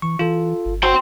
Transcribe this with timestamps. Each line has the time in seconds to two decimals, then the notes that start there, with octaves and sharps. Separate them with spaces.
0.02 E3 C#6
0.19 E3 F4 A4
0.65 G1
0.83 F#4 G5 C6